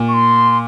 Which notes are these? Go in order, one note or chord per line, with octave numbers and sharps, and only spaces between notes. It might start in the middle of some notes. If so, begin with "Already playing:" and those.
Already playing: A#2
C#6
C6